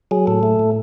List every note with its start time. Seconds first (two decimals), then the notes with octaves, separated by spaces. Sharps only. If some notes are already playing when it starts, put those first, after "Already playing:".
0.11 F#3 G#4
0.27 A2 A4
0.43 A3
0.59 A2